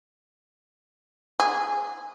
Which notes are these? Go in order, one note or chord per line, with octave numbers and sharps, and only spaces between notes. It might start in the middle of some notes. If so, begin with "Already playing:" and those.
G#4